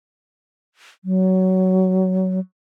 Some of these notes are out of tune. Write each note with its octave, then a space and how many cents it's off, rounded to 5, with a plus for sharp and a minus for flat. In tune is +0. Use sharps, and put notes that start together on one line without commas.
F#3 +15